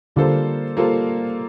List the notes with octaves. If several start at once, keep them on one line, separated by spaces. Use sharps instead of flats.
D3 G3 A#3 F4 A4 C5
G3 A#3 F4 A4 C5